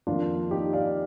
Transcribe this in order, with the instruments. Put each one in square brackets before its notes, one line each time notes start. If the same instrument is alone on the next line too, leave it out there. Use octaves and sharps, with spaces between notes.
[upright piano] F2 D#3 A#3 D4 F4
D#4 G4
D5 F5